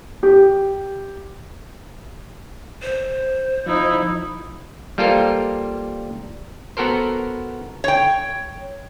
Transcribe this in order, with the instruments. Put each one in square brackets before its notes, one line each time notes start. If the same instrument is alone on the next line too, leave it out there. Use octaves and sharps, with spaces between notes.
[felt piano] G4
[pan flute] C5
[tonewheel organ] F3 [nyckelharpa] D#4 E4
[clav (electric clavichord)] G3 A#3 F4 A4 A#4 C5
B3 F#4 A4 A#4 C5
[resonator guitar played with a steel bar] C#5 G5